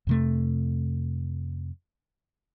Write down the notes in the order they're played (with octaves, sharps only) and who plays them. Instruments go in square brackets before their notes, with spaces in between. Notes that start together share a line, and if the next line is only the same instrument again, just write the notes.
[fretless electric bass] F2 C3 A3